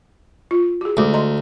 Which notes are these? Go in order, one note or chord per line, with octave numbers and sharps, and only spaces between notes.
F4
F#4 G#4
D2 G#3 F#4 D6
D#5 A#5 C6